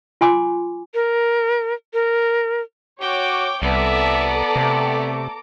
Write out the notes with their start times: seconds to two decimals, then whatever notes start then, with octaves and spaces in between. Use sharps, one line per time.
0.21 F4 G#5 C6 D6
0.93 A#4
1.94 A#4
3.01 F#4 C#5 G5 D6
3.62 C2 B3 A4 D5 E5 A#5 D6
4.56 C3 A3